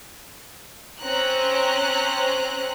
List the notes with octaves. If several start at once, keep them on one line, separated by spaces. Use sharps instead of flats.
C4 C#4 A#5 F#6